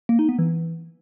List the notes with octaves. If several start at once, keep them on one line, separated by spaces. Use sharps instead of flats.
A#3
D#4
B3
E3